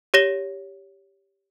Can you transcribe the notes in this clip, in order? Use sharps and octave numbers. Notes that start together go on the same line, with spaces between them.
G4 C#5 A#6 E7 G7